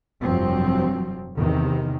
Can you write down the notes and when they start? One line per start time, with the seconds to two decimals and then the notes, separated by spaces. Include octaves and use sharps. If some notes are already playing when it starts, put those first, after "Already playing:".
0.21 F1 G2 F3 F#3 C4
1.36 E2 C3 D#3